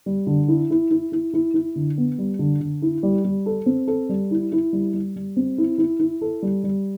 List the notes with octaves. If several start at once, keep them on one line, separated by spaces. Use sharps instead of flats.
G3
D3
E4
E4
E4
E4
E4
E4
D3
B3
G3
D3
D3
E4
G3
G3
A4
C4
A4
G3
E4
E4
G3
G3
G3
C4
E4
E4
E4
A4
G3
G3